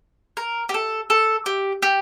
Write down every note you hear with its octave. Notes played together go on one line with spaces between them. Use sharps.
A#4
G4
A4
A4
G4
G4